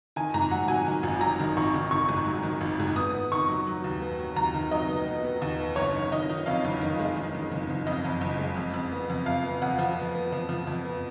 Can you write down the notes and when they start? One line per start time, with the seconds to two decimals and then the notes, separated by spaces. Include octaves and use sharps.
0.16 D#3 G#5
0.34 G#2 A#5
0.51 F#3 F#5
0.68 F#3 G#5
0.86 D#3
1.03 G#1
1.21 F#3 A#5
1.39 D#3
1.57 G#1 C#6
1.74 D#3
1.91 D#3 C#6
2.09 G#2
2.26 F#3
2.43 D#3
2.61 G#1
2.80 G#2
2.96 B3 D#6
3.13 B3
3.32 D#3 C#6
3.48 F#3
3.67 F#3
3.84 D#2
4.02 B3
4.19 F#3
4.36 D#2 A#5
4.54 D#3
4.71 F#3 D#5
4.89 B3
5.06 B3
5.24 B3
5.42 D#2
5.59 B3
5.76 F#1 C#5
5.94 D#3
6.12 D#3 D#5
6.29 D#3
6.46 F2 F5
6.64 F#1
6.82 D#3
6.99 G#3
7.16 D#3
7.34 D#3
7.52 F#1
7.70 F#1
7.87 F2 D#5
8.05 F2
8.21 F#1
8.39 G#3
8.57 F2
8.74 F2
8.92 B3
9.10 F2
9.26 F2 F5
9.44 B3
9.62 F2 F#5
9.79 F3
9.96 B3
10.15 B3
10.32 F3
10.49 F3
10.67 F2
10.84 B3